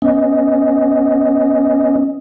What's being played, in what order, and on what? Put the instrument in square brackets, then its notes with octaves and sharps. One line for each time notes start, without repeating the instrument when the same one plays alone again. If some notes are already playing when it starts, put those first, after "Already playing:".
[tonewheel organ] B3 C#4 D#5